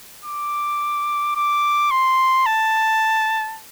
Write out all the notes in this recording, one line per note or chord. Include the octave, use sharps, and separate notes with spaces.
D6
D6
C6
A5